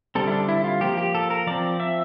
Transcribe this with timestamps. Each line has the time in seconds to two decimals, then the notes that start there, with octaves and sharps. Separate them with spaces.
0.15 D3 G3 C4 A4
0.27 E4
0.32 D4
0.49 E4
0.64 F4
0.81 F3 A#3 G4
0.98 G4
1.15 A4
1.30 A#4
1.47 F3 C4 D5
1.80 E5